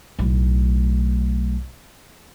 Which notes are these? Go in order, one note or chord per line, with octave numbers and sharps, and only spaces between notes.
B1 A2